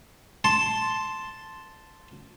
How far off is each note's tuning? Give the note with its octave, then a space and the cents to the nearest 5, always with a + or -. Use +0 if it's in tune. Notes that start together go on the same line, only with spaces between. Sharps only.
A5 +0 C6 +0